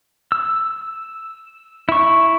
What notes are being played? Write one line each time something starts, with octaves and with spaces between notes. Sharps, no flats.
E6
E4 C#6